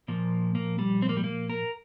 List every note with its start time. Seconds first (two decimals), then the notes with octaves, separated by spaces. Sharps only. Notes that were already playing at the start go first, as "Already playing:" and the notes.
0.08 A#2 F3 A#3
0.55 A#3
0.79 G3
1.02 C4
1.09 A#3
1.17 G3
1.24 A#3
1.50 A#4